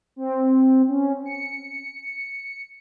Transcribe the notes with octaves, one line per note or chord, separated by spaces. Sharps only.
C4
C#4
C#7